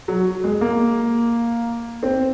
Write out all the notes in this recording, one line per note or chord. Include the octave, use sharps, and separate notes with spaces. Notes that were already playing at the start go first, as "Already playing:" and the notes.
F#3
G#3
A#3
C4